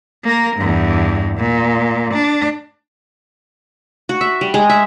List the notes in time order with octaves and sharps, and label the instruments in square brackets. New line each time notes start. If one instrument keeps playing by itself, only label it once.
[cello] A#3 A#4
E2 G2
A#2
D4
[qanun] F#4
E5
G3
G#3
E5